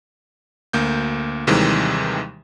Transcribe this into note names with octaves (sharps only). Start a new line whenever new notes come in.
D2 A#3 G6
D#2 C3 D#3 E3 G3 G#3